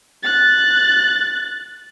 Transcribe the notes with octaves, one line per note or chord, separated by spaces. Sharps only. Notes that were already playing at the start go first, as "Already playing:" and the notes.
F#6 A6